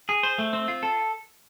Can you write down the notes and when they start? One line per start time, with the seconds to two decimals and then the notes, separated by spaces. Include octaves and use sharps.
0.09 G#4
0.23 C5
0.38 A3
0.53 C4
0.68 F4
0.83 A4